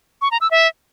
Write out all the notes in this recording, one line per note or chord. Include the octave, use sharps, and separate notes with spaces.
C#6
A#5
E6
E5